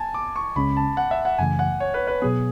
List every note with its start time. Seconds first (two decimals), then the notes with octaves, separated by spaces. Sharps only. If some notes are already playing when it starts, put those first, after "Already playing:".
Already playing: G#5 A5
0.14 D6
0.36 C#6
0.56 C#2 C#3 G#3 C#4 B5
0.77 A5
0.97 F#5
1.11 E5
1.25 F#5
1.38 F#2 C#3 E3 A3 G#5
1.59 F#5
1.80 C#5
1.94 B4
2.07 B4
2.22 B2 F#3 B3 G#4